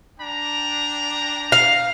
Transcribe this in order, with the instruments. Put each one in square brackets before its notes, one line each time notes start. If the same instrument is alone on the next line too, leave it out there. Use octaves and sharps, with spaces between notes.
[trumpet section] D4 G5 A#5
[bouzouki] F5